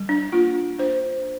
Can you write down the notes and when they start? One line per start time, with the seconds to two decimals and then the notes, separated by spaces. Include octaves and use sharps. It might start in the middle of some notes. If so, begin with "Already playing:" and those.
Already playing: G3
0.09 D4
0.32 A#3 F4
0.79 D4 C5